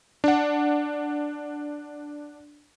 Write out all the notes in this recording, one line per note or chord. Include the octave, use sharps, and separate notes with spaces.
D4 F#5